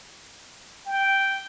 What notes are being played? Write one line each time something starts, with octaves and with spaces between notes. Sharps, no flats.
G5